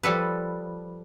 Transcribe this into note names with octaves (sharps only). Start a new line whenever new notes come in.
F3 G3 A4 B4